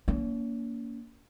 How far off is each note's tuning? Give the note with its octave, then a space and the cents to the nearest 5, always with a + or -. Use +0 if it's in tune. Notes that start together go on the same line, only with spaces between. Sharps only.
A#3 +0 C#4 +40